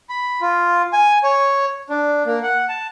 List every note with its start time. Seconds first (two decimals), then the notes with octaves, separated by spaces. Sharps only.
0.09 B5
0.41 F4
0.93 G#5
1.23 C#5
1.90 D4
2.26 A#3
2.43 F#5
2.69 A5